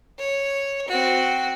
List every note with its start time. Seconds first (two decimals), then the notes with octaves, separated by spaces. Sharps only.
0.18 C#5
0.88 C4 F#4